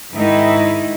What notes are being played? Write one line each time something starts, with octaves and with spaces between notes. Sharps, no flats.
G#2 D#3 D#4 E4